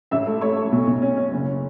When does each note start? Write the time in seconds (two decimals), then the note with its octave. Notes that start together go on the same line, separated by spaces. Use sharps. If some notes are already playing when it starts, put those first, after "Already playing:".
0.11 A1 E5 E6
0.27 A3
0.41 A3 C#5 C#6
0.57 A3
0.72 B1
0.87 B1
1.02 C#4
1.17 C#4
1.32 F#1